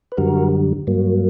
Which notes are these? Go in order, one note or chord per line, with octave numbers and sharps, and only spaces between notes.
B4
F#2 D3 G3 F#4 A#4
G2 F#3 A#3